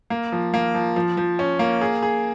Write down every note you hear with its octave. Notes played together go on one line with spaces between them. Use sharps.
A#3
F3
A#3
F3
F3
F3
C#4
A#3
G#4
G#4